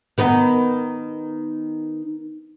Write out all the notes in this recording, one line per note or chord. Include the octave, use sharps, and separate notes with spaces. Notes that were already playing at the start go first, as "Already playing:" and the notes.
D#3 B3 D#4